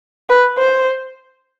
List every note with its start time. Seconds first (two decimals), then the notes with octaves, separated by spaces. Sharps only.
0.29 B4
0.58 C5